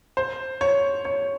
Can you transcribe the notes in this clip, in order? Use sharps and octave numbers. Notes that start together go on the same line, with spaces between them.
C5
C#5
C#5